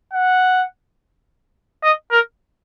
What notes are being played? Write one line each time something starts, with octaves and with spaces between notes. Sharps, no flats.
F#5
D#5
A#4